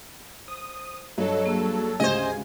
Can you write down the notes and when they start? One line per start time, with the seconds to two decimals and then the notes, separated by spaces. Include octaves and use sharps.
0.48 C5 D#6
1.18 G2 F#3 A4 C#5 D#5
1.44 A#3 G#4
2.00 D2 G#2 C#3 G4 C5 D#5 G#5